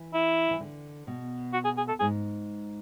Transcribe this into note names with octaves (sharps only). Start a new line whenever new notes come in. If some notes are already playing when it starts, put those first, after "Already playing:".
Already playing: E3
E4
E3
D3
B2
F#4
G#4
G#4
A4
G#2 G#4